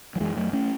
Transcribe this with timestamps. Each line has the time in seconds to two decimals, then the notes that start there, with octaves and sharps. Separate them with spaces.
0.16 F#3
0.20 F#2 E3 G#3
0.37 F#3 A3
0.53 A3 C#4